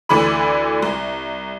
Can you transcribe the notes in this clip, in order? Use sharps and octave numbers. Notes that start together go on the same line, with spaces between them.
D2 D3 E3 D5 B5
C2